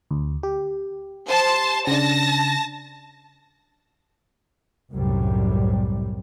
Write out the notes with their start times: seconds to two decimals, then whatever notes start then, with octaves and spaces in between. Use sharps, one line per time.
0.11 D2
0.43 G4
1.29 C5 A5
1.87 C#3 D4 A5 A#6
4.92 C2 F#2 A2 C3 G3